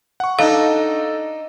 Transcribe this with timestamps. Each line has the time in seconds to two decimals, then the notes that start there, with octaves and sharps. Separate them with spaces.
0.20 F#5 C#6
0.39 D4 D#4 A4 D#5 F5